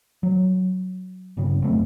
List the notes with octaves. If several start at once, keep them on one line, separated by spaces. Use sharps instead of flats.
F#3
G1 G2 C#3
F2 F#3 A3 C4